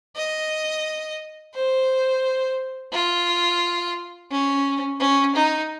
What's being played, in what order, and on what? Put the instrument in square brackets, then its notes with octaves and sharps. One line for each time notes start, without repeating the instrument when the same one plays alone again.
[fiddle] D#5
C5
F4
C#4
C#4
D#4